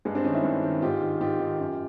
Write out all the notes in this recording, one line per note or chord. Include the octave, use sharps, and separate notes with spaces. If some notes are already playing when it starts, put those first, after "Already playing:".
G2 G#3
C4 D4
D#3 C#4 D#4
D4 E4
G2
D#3
G#2 F4 G4
D#3
G#2 F4 G4
D#3
F#2